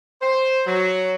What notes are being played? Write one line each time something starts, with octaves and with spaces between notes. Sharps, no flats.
C5
F#3